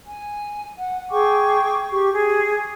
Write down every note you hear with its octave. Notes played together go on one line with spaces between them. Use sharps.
G#5
F#5
G#4 G5 C#6 D6
G4 C#6
G#4